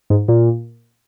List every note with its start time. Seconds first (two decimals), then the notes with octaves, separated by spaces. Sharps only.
0.10 G#2
0.28 A#2